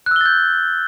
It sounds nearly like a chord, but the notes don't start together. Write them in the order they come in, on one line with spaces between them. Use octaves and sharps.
F#6 E6 G7 A6 G6